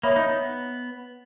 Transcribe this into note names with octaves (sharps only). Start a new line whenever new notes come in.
A#3 C#5 E5 B5 D#6
D#4
B3